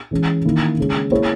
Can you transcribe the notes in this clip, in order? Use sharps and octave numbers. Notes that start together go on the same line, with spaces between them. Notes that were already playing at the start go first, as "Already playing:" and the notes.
E3 G#3 C#4
D#3 A#3 E4
C#3 G#3 C#4
A#3 E4 G#4 C#5